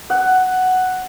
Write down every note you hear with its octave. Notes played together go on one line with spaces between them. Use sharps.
F#5